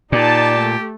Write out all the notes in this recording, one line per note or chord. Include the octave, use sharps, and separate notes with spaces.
A#2 D#4 G4 D5 A5
A3